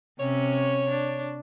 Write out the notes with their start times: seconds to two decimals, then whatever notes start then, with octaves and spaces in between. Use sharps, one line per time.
0.19 C3 C#4 C#5
0.89 D4